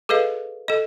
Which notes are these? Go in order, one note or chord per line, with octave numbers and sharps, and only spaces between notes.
G#4 A4 B4 D#5 F5
A4 D#5